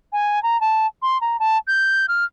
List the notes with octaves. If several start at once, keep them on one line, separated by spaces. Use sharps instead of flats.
G#5
A#5
A5
C6
A#5
A5
G6
F6